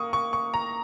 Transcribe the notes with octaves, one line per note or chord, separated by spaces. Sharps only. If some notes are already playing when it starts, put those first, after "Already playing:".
Already playing: A#3 C#6 D#6
C#6
C#6
A#5